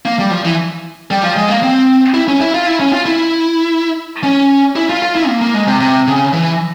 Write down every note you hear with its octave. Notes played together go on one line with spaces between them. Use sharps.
A#3
G3
F3
E3
G3
F3
G#3
A#3
C4
E4
C#4
E4
F4
E4
C#4
F4
E4
C#4
E4
F4
F4
E4
A#3
A#3
G#3
C3
C3
C#3
E3